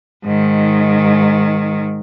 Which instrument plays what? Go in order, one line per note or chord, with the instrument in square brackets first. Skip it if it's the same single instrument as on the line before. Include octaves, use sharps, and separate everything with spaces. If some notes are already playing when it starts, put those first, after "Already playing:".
[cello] G#2 D#3